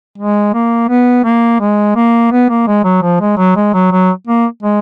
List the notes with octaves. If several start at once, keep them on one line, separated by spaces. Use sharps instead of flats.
G#3
A#3
B3
A#3
G#3
A#3
B3
A#3
G#3
F#3
F3
G#3
F#3
G#3
F#3
F#3
A#3
G#3